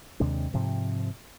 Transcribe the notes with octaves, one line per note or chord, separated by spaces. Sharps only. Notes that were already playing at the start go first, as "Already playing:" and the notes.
D#2 C3 G#3 D4
G#2 C3 F3